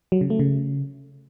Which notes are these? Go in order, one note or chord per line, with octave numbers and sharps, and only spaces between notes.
F#3
C#3
A3
C#3